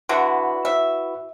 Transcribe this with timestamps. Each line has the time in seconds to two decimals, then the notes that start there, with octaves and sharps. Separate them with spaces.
0.09 D3 E4 F#4 B4
0.65 E5